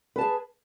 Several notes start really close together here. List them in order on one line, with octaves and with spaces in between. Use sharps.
B4 A5 G#4